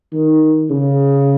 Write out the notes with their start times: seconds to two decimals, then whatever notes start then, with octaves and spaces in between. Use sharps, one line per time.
0.13 D#3
0.71 C#3